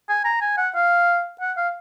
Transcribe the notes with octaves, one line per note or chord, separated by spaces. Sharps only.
G#5
A#5
G#5
F#5
F5
F#5
F5